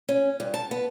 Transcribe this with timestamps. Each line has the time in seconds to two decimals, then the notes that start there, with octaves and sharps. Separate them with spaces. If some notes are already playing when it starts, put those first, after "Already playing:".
0.09 C#4
0.40 G2
0.54 A5
0.71 B3